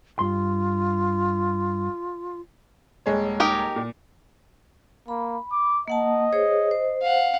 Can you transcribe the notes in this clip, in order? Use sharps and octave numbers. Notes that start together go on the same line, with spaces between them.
G2 F4 C6
D#1 G#3 C#5
D#4 G4 A#4
A#2
A#3 B5
D6
A#3 D#5 F#5 A5
G#4 C5 C#5
C5
F5 F#5